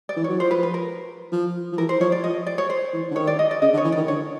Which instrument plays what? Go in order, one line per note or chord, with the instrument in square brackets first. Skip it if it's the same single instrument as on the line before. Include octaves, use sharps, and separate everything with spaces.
[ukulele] D5
[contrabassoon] E3
[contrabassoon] F#3 [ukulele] C#5
[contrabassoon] F3 [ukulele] C5
[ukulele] B4
B4
A#4
[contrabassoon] F3
F3
[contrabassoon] E3 [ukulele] A#4
[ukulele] C5
[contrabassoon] F3 [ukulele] C#5
[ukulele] D5
[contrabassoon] F3 [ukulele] D#5
[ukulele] D5
C#5
C5
[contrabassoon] E3
D3
[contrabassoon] D#3 [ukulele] C#5
[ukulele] D5
D#5
D5
[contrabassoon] C#3 [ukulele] D#5
[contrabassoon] D3
[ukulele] C#5
[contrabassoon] E3
[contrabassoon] D#3 [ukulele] D5
[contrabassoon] D3 [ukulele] C#5